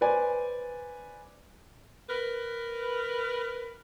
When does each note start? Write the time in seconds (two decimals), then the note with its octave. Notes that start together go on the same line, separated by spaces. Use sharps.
0.01 B4 C5 D5 G#5
2.10 A#4 B4